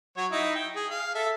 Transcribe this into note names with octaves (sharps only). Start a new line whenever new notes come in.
F#3 F#4 C#5
D#4 E4 E5
G5
G#4
F5
A4 E5